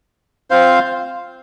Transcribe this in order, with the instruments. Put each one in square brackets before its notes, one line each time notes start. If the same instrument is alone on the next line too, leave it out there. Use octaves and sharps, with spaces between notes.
[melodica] C4 F4 C5 F5